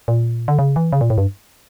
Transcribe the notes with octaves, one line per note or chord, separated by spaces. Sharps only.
A#2
D3
C#3
E3
C#3
A#2
A2
G2